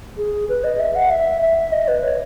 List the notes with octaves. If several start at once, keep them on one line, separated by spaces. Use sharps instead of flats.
G#4
B4
D#5
E5
F#5
E5
E5
D#5
B4
C#5